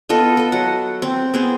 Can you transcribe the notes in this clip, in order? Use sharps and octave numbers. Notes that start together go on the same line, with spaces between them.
B3 F4 A4 D#5
A4 D#5
F#3 F#5
C4
B3 C4 G#4